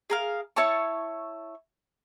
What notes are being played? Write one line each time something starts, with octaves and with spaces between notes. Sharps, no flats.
G#4 A#4 F5
E4 C#5 A5 C#6